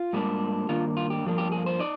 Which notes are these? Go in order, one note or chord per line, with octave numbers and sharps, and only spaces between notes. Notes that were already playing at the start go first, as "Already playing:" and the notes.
Already playing: F4
G#2 G3 A#3 D4
G2 D#3 A#3 D4 F4
F4
G4
G2 F3 A#3 D4
G4
G#4
C5
D#4 D5